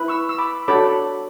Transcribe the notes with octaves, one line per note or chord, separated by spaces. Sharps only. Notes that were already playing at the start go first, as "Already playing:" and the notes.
Already playing: E4 B4
C#6 E6
E6
B5 D6
D4 F#4 A4 C#5 B5 D6